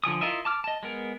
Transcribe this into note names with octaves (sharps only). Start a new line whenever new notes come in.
D3 F3 G#5 D#6
E4 F4 A#4 D#5 E5
A5 D6 F6
D#5 A5
G#3 B3 A#4